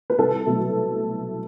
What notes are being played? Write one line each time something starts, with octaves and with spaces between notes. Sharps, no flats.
B4
C2 A4
B2 F#3 A3